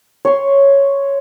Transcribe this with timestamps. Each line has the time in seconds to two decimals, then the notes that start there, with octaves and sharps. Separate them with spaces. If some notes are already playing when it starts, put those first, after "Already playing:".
0.25 C#5 C6